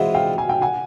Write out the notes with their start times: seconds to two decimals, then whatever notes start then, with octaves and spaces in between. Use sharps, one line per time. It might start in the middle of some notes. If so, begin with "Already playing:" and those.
Already playing: E3 G#3 C4 F4 E5 F#5
0.14 F5 G5
0.38 G#5
0.49 G5
0.61 F#5 G#5